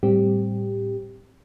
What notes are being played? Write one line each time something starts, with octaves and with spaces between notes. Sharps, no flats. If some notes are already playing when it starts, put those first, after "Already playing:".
A2 G3 C4 G4